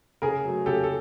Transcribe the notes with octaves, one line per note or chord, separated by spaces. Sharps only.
C#3 G#4 A#4
F#3 A3
C#3 G4 A4
A4